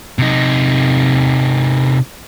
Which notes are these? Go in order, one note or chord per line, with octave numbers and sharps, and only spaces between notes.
C3 D#4